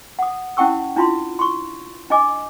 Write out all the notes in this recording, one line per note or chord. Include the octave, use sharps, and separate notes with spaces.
F#5 D#6
C#4 E4 F#5 G5 C#6 E6
D4 E4 F4 B5 C6
C6 C#6
D4 D#5 G#5 D6